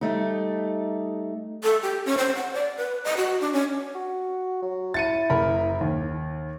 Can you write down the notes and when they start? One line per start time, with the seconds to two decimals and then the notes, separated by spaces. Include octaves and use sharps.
0.01 G3 A3 D#4
1.63 A4
1.83 G4
2.06 C#4
2.18 C5
2.35 F#5
2.54 D5
2.77 B4
3.04 D#5
3.17 F#4
3.41 D4
3.53 C#4
3.95 F#4
4.62 F#3
4.94 E4 A6 C#7 D#7
5.30 F#1 A#4 B5
5.81 D#2